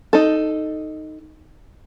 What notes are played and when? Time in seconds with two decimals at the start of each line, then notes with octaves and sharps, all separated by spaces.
0.13 D#4 A4